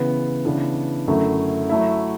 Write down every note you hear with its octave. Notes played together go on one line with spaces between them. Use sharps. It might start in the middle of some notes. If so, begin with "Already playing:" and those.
Already playing: C#3 E3 B3
C#3 E3 B3 D4
F#2 D3 F#3 A3 E4
F#3 A3 E4